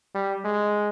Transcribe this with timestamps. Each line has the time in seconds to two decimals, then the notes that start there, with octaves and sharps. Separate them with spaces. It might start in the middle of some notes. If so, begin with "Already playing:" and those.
0.15 G3
0.44 G#3